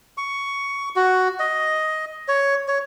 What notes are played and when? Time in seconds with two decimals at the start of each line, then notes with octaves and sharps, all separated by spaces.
0.18 C#6
0.96 F#4
1.39 D#5
2.28 C#5
2.68 C#5